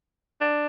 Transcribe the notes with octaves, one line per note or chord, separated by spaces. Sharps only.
D4